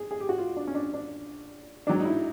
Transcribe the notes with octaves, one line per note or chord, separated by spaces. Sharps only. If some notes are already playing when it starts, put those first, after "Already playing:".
Already playing: G#4
G#4
G4
F#4
F4
D4
C#4
D4
D4
G#2 D#3 F#3 D4
D#4
E4